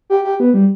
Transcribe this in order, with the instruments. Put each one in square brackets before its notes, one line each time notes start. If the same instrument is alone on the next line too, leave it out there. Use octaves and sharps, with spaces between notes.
[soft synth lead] G4
G4
B3
G3